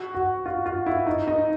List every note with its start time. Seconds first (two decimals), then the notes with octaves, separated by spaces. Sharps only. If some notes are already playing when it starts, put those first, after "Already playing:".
Already playing: F#4
0.15 F#4
0.46 F4
0.66 F4
0.86 E4
1.07 D#4
1.28 D#4